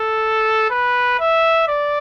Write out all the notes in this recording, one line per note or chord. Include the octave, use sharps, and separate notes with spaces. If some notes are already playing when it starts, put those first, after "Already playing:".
Already playing: A4
B4
E5
D5